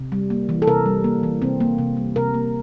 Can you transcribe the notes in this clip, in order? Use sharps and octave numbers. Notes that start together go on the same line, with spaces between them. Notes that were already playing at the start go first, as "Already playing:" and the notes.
Already playing: C3
G3
A#3
E3
A4
C3 A#4
G3
A#3
E3
C3 C4
A#3
C3
G3
C3 A#4
A#3